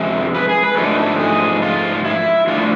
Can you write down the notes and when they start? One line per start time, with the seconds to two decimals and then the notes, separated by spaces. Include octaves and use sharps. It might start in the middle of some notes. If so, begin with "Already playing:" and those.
Already playing: F2 C3 G#3 C4 E5
0.34 B4
0.49 G#4
0.63 B4
0.77 G#2 F3 A3 D4 A4
0.99 A4
1.19 G#4
1.62 F4
2.04 E4
2.47 A2 F3 A3 D4 F4